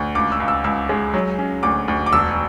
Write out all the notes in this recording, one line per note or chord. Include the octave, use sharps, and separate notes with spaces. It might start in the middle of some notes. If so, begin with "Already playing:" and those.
Already playing: D2
C#2 D6
E6
C#2
E6
C#2 E6
G#3
F#3
C#4
D2 D6
D2
D6
E1 E6